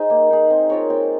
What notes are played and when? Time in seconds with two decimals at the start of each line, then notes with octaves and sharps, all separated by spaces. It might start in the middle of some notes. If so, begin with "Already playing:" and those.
Already playing: D#4 G#4 C5
0.10 A#3
0.30 D#4 G#4
0.50 C4
0.70 F4 A#4 C#5
0.90 C4